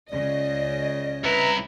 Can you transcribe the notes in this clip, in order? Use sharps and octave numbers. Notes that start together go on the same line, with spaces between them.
C#2 C#3 D5 D#5
C2 E4 B4 E5 A#5